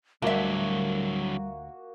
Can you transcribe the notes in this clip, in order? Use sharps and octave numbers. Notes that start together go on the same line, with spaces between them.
D2 D3 F#3 G3 A#3 F#4 E5